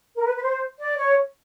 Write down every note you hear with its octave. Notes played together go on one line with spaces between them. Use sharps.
A#4
B4
B4
C5
D5
C#5